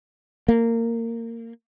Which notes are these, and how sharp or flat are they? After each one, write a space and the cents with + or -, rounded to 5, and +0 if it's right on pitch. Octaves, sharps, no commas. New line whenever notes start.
A#3 -20